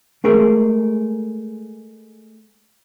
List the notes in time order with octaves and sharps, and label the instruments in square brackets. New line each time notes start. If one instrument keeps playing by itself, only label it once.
[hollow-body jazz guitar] G#3 A3 G#4 A#4